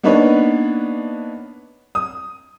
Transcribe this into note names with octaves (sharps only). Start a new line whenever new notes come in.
A#3 B3 D4 D#4 B4 C#5
D#6